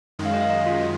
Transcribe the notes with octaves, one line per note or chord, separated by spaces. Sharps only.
F#2 D#3 G#3
F5
D#5
F5
D#5
F4